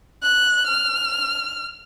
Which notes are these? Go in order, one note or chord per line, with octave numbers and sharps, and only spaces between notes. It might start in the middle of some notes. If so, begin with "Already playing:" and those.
F#6
F6